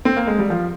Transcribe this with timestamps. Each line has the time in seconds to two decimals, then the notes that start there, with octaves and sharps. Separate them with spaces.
0.05 C4
0.17 A#3
0.27 G#3
0.39 G3
0.50 F3